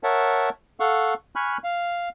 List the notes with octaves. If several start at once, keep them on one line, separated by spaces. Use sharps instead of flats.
A#4 C#5 E5 F#5 A5
A4 F5 F#5 C#6
G#5 B5 C#6 F6 F#6
F5